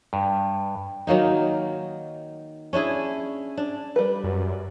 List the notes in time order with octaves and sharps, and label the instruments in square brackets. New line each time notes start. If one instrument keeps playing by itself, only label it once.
[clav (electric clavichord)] G2
[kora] D#3 F#3 A#3 D#4
C#4 D4 E4 G#4
D4
[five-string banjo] G3 B4
[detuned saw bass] F#2